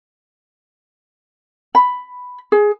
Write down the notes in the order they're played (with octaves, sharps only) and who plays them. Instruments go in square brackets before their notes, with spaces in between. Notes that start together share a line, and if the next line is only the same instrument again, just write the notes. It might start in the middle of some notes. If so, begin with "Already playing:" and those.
[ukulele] B5
G#4